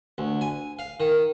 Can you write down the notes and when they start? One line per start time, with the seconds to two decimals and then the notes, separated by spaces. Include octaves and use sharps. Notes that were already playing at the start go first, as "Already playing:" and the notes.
0.18 D2
0.41 G#5
0.79 F5
1.00 D#3